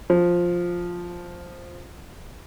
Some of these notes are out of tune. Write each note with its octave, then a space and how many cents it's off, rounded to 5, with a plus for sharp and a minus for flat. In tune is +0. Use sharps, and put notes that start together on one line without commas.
F3 +5